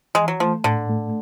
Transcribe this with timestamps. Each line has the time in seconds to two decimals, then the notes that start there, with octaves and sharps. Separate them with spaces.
0.15 E3 G#3
0.28 F#3
0.40 F3 A3
0.64 A2 D3
0.89 A3